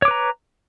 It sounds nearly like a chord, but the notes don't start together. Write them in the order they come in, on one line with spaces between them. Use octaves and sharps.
C#5 D6 B4 A#5